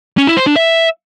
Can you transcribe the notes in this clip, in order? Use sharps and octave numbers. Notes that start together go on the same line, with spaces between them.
C#4
E4
C5
D4
E5